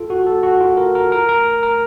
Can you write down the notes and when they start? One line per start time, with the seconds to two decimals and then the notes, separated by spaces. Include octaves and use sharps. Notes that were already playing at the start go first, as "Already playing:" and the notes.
Already playing: F4 A4
0.10 F#4
0.27 A4
0.43 F#4
0.61 F4
0.77 A#4
0.95 A#4
1.12 A#4
1.29 A#4
1.63 A#4